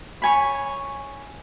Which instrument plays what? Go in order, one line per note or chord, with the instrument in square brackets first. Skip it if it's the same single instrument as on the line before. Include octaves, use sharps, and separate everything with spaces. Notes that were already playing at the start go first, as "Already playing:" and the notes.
[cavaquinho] C#5 G#5 B5